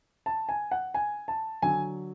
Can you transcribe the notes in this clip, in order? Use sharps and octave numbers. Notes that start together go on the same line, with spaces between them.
A5
G#5
F#5
G#5
A5
D3 F#3 G#5